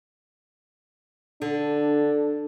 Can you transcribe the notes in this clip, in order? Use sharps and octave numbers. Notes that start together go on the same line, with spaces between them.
D3 D4